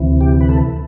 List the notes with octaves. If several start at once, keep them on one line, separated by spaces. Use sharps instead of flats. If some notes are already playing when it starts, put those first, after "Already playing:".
Already playing: D2 C3 E3
G4
B4
A4